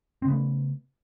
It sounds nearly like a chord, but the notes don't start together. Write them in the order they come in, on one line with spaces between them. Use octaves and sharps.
C4 C#3 B3 A3